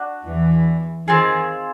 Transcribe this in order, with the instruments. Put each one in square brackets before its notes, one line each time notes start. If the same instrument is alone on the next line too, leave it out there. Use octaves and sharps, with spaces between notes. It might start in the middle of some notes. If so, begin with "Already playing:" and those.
Already playing: [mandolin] D4 F#4
[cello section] E2 E3
[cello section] D#3 [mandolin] C4 F4 G#4